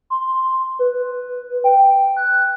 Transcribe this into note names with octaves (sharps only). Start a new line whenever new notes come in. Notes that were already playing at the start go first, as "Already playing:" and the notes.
C6
B4
G5
F#6